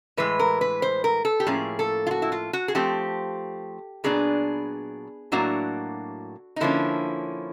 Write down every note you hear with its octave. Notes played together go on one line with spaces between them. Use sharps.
A2 E3 G#3 B4
A#4
B4
C5
A#4
A4
G4
A2 F3 A#3 C#4 G#4
A4
F4
F#4
E4
F4
F#4
G#4
F3 A3 C4 G4
A#2 F#3 B3 D4 G#4
A2 F#3 A#3 D4 F#4
D#4
D3 F3 A#3 C#4 E4